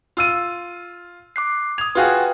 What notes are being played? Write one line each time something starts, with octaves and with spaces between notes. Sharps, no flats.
F4 E6 D#7
D6 F#6 C7
D#6 G#6 F7
F4 F#4 G#4 B4 F5 G5